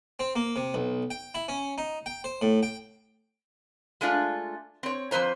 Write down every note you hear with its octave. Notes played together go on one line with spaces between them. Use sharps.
C4
A#3
C3
B1
G5
E4
C#4
D#4
G5
C5
A2
G5
G#3 A3 D4 F4
C4 C#5
F2 G3 B4 C5 A#5